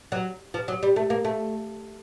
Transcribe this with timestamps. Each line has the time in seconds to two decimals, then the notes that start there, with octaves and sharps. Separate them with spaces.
0.12 F#3
0.54 F3
0.68 F#3
0.83 G3
0.96 A3
1.10 A#3
1.25 A3